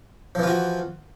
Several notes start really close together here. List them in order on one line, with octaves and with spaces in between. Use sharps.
F3 E3 F4 F#4